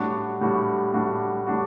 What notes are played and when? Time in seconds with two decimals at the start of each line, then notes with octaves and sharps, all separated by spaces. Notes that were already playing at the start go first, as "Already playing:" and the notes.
Already playing: A2 G3 D4 F#4
0.41 A2 G3 D4 F#4
0.94 A2 G3 D4 F#4
1.46 A2 G3 D4 F#4